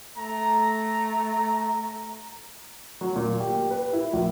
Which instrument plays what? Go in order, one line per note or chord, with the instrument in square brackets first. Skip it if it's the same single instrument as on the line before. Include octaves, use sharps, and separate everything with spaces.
[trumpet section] A3 A#5
[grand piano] F#3
A#2
G4
B4
E4
A#1